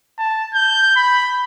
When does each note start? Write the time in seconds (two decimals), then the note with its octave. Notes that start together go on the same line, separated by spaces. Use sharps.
0.18 A5
0.54 G6
0.96 B5